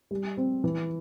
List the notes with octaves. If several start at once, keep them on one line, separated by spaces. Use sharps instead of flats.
G3
C4
E3